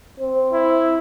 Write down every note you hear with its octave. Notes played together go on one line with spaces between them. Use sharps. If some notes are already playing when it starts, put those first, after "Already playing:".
C4
E4